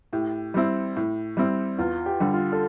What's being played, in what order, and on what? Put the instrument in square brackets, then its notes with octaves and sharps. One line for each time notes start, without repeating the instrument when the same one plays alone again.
[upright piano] A2 [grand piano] G4
[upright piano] G3 C4 E4
A2
G3 C4 E4
[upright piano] E2 [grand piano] F4
[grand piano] G4
[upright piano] D3 G3
[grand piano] F4
A4